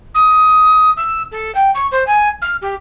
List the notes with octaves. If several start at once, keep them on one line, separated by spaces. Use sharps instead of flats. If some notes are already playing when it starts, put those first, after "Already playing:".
D#6
E6
A4
G5
C#6
C5
G#5
F6
G4